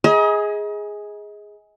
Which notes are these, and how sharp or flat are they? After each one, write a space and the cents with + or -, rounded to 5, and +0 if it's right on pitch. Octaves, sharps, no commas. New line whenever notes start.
G#4 +0 D#5 +30 A#5 +45